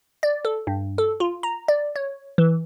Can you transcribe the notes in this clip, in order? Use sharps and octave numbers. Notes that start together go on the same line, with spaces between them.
D5
A4
G2
A4
F4
A#5
D5
C#5
E3